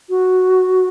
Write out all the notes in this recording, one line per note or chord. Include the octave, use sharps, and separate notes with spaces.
F#4